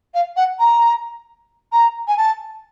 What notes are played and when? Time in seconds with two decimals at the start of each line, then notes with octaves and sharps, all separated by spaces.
0.14 F5
0.36 F#5
0.59 A#5
1.72 A#5
2.08 G#5
2.17 A5